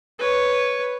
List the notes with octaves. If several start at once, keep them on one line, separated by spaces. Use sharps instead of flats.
B4 C#5